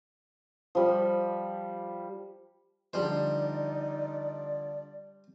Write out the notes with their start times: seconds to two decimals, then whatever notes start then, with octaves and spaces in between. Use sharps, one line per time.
0.75 F3 G3
2.93 D3 F3 G3 D#4 C5 D5